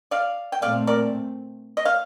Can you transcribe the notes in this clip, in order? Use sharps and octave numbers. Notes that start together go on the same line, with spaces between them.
D5 F5
G5
A#2 A3 C4 D5 F5
A#4 D5
D#5
F5